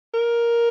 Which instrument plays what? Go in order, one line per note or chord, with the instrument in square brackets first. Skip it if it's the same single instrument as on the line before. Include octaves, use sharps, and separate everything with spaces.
[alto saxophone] A#4